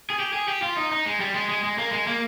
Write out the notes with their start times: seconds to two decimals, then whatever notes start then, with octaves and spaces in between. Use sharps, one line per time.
0.10 G#4
0.20 G4
0.33 G#4
0.48 G4
0.62 F4
0.77 D#4
0.92 D#4
1.06 G#3
1.20 G3
1.35 G#3
1.49 G#3
1.64 G#3
1.78 A#3
1.92 G#3
2.07 A#3